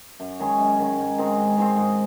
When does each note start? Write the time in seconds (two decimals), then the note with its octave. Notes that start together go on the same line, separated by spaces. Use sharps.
0.20 F#2
0.40 D#3 G#3 C#4
0.58 F#2
0.79 D#3 G#3 C#4
0.98 G#2
1.18 D#3 G#3 C4
1.37 G#2
1.57 D#3 G#3 C4
1.76 G#2